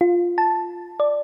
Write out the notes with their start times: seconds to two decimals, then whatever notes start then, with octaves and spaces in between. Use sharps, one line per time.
0.01 F4
0.38 A5
1.00 D5